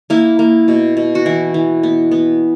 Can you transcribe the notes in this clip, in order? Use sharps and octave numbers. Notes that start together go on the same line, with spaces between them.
A#3 E4
A#3
B2
B2
F#4
E3 E4
E3
B3
B3